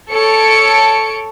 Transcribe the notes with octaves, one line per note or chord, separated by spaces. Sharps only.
A4 C#5 C#7 D7